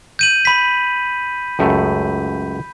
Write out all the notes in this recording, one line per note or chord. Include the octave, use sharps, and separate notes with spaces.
G6 D#7 F#7
B5 B6
C#2 F#2 A3